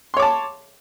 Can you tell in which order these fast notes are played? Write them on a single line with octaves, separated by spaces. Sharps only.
C6 C#5 D6 A5